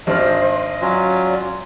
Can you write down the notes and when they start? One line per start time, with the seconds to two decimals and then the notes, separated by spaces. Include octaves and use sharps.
0.07 G#1 D4 C5 D#5 F6
0.82 F#3 C#4 F4 D5